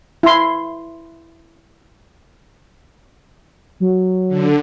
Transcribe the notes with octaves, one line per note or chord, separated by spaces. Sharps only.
E4 C6
F#3
D3